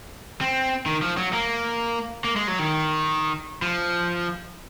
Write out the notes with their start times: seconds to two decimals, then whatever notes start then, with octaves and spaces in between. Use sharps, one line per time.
0.41 C4
0.86 D#3
1.02 F3
1.17 F#3
1.33 A#3
2.24 A#3
2.36 G#3
2.48 F#3
2.59 D#3
3.62 F3